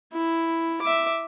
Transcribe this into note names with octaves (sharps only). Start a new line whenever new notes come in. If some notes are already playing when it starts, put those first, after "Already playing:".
E4
E5 D6